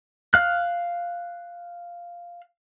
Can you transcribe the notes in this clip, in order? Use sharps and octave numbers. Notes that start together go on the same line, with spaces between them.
F5 F6 F#6